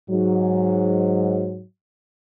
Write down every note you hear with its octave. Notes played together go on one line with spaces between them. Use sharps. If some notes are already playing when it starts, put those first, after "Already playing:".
G#2 F#3